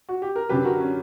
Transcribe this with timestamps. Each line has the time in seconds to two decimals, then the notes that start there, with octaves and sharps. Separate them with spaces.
0.09 F#4
0.22 G4
0.36 A#4
0.49 F#2 D3 F#3 G4 B4
0.65 F#4 A#4
0.80 C#4